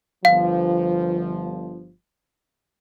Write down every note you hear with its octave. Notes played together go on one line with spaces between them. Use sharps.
G1 F3 F5